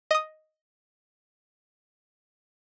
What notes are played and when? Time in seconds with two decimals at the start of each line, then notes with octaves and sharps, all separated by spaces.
0.11 D#5 D#6